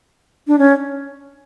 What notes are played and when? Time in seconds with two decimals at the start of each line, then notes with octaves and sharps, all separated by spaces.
0.47 D4
0.59 C#4